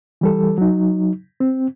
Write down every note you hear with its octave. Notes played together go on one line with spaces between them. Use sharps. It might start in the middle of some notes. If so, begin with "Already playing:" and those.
E3 G3 A4
F#3 D#4
C4